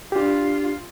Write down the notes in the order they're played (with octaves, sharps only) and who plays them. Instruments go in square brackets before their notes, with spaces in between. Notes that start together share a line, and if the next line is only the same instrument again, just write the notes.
[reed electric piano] D4 G4 [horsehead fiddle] F4